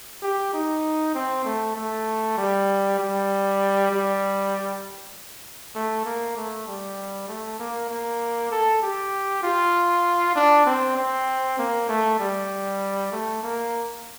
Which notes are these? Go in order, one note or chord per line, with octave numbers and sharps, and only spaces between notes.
G4
D#4
C4
A3
A3
G3
G3
G3
A3
A#3
A3
G3
A3
A#3
A#3
A4
G4
F4
D4
C4
C4
A#3
A3
G3
A3
A#3